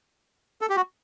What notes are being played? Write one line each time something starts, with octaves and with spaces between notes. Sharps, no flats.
A4
G4
F#4